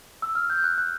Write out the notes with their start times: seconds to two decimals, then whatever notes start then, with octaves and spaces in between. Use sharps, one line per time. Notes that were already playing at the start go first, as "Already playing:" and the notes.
0.22 E6
0.35 F6
0.50 G6
0.64 F#6
0.78 F#6